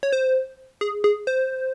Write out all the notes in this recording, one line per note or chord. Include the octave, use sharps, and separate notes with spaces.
C#5
C5
G#4
G#4
C5